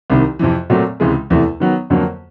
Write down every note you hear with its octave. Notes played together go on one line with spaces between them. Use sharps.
C2 C3 D#3
F2 C3 E3
A#2 F#3 A3 C4
C#2 C3 E3 G#3
E2 C3 E3 A3
D#3 F#3 B3
F2 D3 F#3 A#3